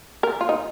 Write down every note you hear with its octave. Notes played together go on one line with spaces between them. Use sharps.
A#4
F4
D#4